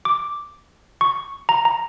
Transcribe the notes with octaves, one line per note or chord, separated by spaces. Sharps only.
D6
C#6
A#5
A#5